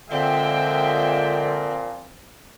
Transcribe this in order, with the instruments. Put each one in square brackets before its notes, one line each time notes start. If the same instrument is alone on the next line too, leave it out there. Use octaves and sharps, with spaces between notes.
[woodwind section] A#2 F3 [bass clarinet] D3 [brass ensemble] G#3 E5 G5 [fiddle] C4